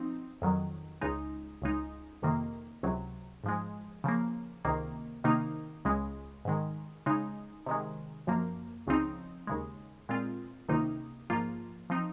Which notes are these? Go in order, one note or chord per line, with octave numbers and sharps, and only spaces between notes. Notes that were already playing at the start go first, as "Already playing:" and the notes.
Already playing: F3 C4 D#4
F2 D#3 F#3
C#2 C#3 G#3 D#4
C#2 C#3 G#3 D#4
F2 C3 D#3 A#3
C#2 C3 F#3
G#2 F3 G#3
C#3 F3 A#3
C#2 C3 D#3 A#3
C3 D#3 A#3 D#4
C#2 C#3 G#3
G#2 D#3 G#3
C#3 G#3 D#4
C3 D#3 G#3
F#2 F3 A#3
C#2 C#3 F3 C4 D#4
D#2 C#3 G#3
A#2 G#3 C4 F4
C#2 C3 D#3 A#3 D#4
G#2 F3 A#3 F4
F3 C4 D#4